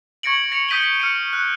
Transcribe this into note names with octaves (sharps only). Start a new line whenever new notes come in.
C#6 G#6 A#6 C#7 D7 F#7
A#6 C#7 F7
D#6 G6 B6 D#7 F#7 G7
B6
F6 C#7 D#7
F#6